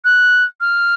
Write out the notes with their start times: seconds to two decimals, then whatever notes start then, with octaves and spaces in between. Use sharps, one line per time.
0.05 F#6
0.61 F6